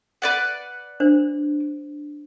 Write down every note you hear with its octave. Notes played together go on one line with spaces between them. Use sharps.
B4 D5 F#5
D4 C5